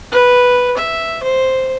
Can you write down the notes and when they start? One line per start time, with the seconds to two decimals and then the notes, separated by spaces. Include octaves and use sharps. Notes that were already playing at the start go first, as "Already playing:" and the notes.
0.12 B4
0.78 E5
1.23 C5